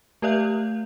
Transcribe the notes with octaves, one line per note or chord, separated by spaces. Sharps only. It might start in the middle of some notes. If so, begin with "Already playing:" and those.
A3 G4 D5 E5 F5 G6